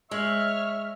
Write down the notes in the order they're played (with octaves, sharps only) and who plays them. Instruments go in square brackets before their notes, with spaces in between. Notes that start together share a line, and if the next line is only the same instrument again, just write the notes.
[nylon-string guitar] G#3 [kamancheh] C#5 F6 [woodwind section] E5